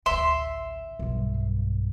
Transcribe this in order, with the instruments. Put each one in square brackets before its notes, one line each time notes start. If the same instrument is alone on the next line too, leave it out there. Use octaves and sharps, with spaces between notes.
[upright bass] A1 D2 [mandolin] E5 C6
[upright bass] B1 G2